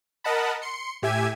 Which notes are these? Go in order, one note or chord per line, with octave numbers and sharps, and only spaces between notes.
A#4 D#5 F#5 A5 B5
C6 C#7
A2 G4 E5 G#5 G#6